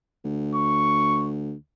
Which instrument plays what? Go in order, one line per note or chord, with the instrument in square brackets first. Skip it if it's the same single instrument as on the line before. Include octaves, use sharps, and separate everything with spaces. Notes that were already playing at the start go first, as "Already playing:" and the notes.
[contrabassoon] D2
[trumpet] C#6